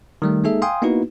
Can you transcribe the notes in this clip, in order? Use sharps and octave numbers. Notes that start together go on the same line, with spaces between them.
D#3 G3 A3
G#3 A#3 D#4 G#4 A4 E5
F5 G5 G#5 C6 D#6
A#3 B3 D#4 E4 F#4 B4